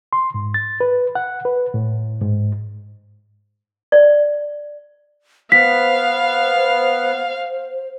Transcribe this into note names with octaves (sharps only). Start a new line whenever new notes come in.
C6
G#2
A6
B4
F#5
B4
A2
G#2
D5
B3 C5 F5 B6